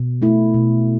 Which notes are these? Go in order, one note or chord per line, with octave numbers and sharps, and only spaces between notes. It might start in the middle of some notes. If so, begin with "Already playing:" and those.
Already playing: B2 B3
A3 E4
B2